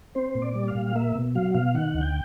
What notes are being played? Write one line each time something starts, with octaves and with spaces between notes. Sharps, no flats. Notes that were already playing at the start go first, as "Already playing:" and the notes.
C4 C5
A#2
D5
G3
F5
A#2
A#3 E5
B2
F#3 F5
B2 F5
D#3 F#5
D2
G5